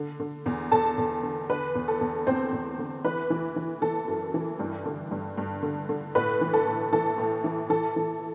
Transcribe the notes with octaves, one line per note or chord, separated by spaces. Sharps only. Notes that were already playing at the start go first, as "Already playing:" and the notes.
Already playing: D3
D3
E2
E2 A4 A5
E2
D3
D3 B4
E2
A4
E2
E2 C4 C5
E2
D3
E3 B4
E3
E3
E3 A4
F#2
E3
G2
D3
G2
G2
D3
D3
A2 B4
E3
A4
A2
E3 A4
A2
E3
E3 A4
E3